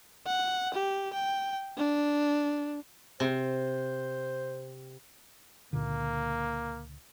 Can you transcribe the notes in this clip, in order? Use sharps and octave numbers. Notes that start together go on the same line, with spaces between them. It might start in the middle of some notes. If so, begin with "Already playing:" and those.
F#5
G4
G5
D4
C3 C5
C#2 A#2 D3 A#3